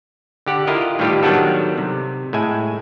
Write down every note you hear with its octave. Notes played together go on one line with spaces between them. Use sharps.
D3 G4 F#5
E4 F4 A#4 D#5
A2 D#3 E3 G3 F4 G4
D#3 F#3 G3 B3 D4 A4
C3
A2 G#3 E5 G#5